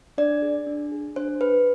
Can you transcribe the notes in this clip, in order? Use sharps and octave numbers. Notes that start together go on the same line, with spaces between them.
D4 D5
G#4
D4
G#4
D4 C5
G#4 B4